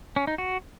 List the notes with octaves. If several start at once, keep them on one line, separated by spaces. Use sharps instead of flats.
C#4
D#4
F#4